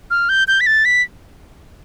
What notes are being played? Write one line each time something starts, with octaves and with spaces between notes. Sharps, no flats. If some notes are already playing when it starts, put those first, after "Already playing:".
F6
G6
G6
B6
A6
B6